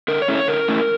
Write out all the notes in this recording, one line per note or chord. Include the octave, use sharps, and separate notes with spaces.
D3 A#4
C#5
A3 C#4 E4
C#5
D3 A#4
A3 C#4 E4